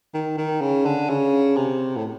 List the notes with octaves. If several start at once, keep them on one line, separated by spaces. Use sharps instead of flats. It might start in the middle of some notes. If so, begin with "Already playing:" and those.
D#3
D#3
C#3
D3
C#3
C3
A2